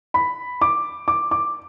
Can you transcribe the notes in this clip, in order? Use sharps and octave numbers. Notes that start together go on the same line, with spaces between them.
B5
D6
D6
D6